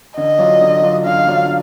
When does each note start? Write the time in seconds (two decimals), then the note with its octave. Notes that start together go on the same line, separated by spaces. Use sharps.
0.17 D3 D#5
0.39 F#3 D4 F4
0.61 D3
0.83 F#3 D4 F4
1.05 D3 F5
1.28 F#3 D4 F4